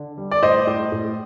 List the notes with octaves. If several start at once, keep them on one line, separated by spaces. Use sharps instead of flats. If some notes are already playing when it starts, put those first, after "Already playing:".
Already playing: D3
G3
D5
A2 C5 D#5
A2
A2